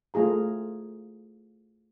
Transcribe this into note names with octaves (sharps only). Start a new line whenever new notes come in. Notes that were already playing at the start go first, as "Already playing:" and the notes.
A3 F4 G#4 A#5